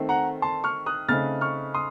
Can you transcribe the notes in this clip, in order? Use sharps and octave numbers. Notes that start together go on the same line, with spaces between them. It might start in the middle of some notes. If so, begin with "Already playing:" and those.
Already playing: D#3 A3 C4
F#5 A#5
A5 C6
C#6 F6
D#6 F#6
C#3 A3 C4 D#4 F6 A6
C#6 F6
C6 D#6